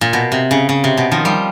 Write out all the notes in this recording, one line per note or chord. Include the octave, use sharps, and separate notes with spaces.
A#2
B2
C3
C#3
C#3
C3
B2
D#3 F3
F3 G3